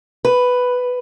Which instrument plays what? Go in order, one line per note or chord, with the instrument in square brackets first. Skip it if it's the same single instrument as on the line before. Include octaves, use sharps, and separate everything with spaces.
[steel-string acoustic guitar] B4